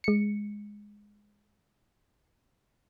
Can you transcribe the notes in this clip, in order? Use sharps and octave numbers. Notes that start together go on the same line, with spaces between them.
G#3 C#7